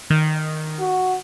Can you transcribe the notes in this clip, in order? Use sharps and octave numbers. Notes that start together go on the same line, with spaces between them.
D#3
F#4